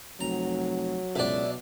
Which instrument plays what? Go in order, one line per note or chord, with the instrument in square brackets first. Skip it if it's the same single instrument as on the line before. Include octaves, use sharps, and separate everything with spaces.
[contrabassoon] F1 [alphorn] F#3 [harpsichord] A#5
[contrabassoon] C#2 [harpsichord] B2 D4 [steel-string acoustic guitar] D5 E5